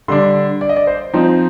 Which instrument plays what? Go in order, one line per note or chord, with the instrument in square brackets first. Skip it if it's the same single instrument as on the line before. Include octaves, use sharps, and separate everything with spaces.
[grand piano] D3 G3 D4 C6
D5
D#5
D5
C5
F3 C4 D#4